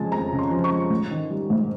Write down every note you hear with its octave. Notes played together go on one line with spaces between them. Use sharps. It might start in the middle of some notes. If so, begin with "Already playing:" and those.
Already playing: F2 C#3 F3 G#3 G#5 A5
F2 A#5
C#3
C6
F3
C#6
G#3
G#2
D#3
G3
G#2